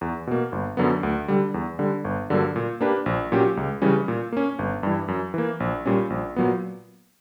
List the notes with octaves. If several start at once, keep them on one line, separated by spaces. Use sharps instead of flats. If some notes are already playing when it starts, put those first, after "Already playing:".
E2
B2 A#3
G1
F#2 D3 F#3 B3
D2
D3 G3
E2
D3 G3
G1
G2 D3 F#3 A#3
A#2
A#3 D4 G4 B4
A#1
A#2 F#3 C#4 G4
C#2
C#3 E3 G3 C#4
A#2
A#3 C#4
G1
G2 E3
F#2
E3 A#3
A#1
A#2 G3 C#4
A#1
A#2 F#3 B3